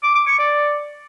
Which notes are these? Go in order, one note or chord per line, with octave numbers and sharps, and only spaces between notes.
D6
D6
C#6
D5